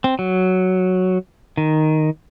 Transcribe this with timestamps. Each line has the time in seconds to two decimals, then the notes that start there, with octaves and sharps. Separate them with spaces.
0.04 C4
0.19 F#3
1.57 D#3